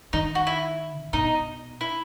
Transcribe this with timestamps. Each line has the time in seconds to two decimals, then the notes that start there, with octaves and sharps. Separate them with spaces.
0.13 D#3 D#4
0.35 F#4
0.47 E4
1.02 A2
1.13 B2 D#4
1.81 E4